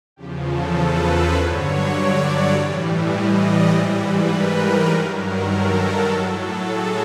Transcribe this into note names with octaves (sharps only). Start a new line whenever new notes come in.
E2 C#3 F3 G4
A4
B4
C5
G2 D3 F#3 C#5
D5
C#5
A2 E3 G3 C5
D#5
D5
G#2 E3 G3 C5
B4
A#4
G2 D#3 F#3 A#4
A#4
A4
A#4
A2 F#3 A4
A4
G#4